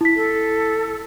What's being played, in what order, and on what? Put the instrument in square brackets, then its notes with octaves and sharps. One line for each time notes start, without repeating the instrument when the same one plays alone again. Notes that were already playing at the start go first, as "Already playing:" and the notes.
[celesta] E4 B6
[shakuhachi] A4